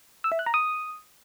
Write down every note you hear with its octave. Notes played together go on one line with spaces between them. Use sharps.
E6
E5
F#6
A#5
D#6